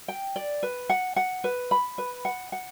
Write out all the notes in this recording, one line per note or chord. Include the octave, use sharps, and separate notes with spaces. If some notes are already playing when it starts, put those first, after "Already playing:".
G5
D5
B4
F#5
F#5
B4
B5
B4
F#5
F#5